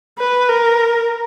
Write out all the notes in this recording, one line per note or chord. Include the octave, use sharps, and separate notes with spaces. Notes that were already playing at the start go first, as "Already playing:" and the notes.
B4
A#4